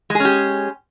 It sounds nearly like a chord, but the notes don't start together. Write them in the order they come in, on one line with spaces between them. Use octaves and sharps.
G#3 G#4 C#4 G4